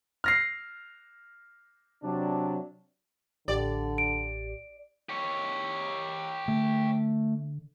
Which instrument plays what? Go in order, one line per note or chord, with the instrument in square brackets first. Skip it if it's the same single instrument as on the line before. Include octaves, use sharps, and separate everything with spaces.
[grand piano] F6 A#6 C7
[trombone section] C3 F#3 D4
[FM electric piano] A1 G4 [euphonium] D3 [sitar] D5
[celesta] D7
[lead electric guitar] G4 C#5
[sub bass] D3 [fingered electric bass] A3